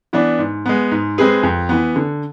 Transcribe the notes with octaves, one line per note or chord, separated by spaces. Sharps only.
E3 B3 D4
G#2
G#3 B3
G#2
G#3 C4 G#4 B4
F2
E3 B3
D3